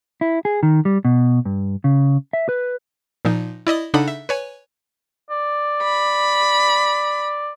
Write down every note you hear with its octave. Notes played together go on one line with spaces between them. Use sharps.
E4
G#4
D#3
G3
B2
G2
C#3
E5
B4
A#2 F3 D#4
E4 D5 D#5 D#6
C#3 D4 D#4 A4 F#5 B5
E5
B4 C#5 G#5
D5
B5